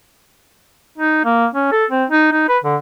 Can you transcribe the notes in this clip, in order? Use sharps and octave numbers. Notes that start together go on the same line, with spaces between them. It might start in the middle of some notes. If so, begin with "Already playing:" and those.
D#4
A#3
C#4
A4
C4
D#4
D#4
B4
D3